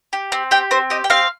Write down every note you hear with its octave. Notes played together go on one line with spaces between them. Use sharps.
G4
C4
G4 G5
C4 C5
G4 D#5
G5
C4 F5